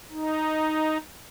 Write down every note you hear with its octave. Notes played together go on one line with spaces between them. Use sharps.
D#4